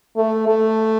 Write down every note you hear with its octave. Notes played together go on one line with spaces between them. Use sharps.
A3
A3